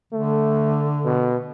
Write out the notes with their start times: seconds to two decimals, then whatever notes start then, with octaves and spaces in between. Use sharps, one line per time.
0.13 D3 A3
1.05 B2